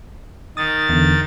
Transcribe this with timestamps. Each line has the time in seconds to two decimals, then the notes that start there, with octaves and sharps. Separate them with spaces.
0.57 D#3 D#6 A6
0.89 E2 D3